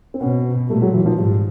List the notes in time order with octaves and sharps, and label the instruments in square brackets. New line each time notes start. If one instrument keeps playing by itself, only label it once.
[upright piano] C4
[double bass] B2 [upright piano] B3 C#4
[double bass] A#2 [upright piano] G3 A3
[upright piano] F#3 G#3
E3 F#3
D#3 F3
[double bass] G#2 [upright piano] F3 G3